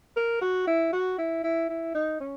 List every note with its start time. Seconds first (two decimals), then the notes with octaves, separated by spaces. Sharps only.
0.17 A#4
0.41 F#4
0.67 E4
0.93 F#4
1.18 E4
1.44 E4
1.69 E4
1.95 D#4
2.20 C#4